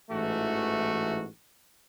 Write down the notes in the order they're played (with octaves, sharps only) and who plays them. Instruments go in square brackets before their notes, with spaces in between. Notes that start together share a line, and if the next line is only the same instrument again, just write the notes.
[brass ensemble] A1 G#2 E3 A3 F#4